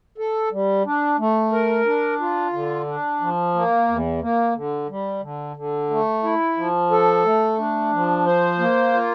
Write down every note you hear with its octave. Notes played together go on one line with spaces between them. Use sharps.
A4
G3
D4
A3
A#4
D4
F4
D3
D4
F3
A#3
E2
A#3
D3
G3
D3
D3
A3
E4
F3
A4
A3
D4
F3
C5
A#3
F4